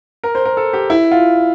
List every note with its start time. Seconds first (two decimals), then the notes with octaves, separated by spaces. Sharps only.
0.24 A#4
0.35 C5
0.45 A#4
0.57 A4
0.73 G4
0.90 E4
1.11 F4